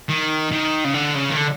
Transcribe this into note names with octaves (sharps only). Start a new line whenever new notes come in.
D#3
D#3
C#3
D3
C#3
D#3
D3